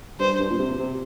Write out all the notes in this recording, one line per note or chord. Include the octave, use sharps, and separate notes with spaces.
G2 C5
G2
A#2
C3
C3